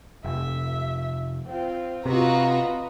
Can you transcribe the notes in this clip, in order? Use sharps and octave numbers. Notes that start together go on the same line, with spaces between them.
F1 E5
C4 F4
C3 F4 F#4 B4 D#5 A#5